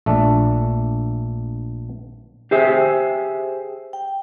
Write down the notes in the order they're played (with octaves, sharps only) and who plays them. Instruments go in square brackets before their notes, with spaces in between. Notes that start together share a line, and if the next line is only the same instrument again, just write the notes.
[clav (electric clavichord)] A#1 A3 D4
[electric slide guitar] G4 G#4 C5 E5
[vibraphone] G5